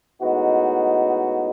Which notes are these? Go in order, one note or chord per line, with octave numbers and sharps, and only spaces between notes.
A2 G#3 B3 D#4 F#4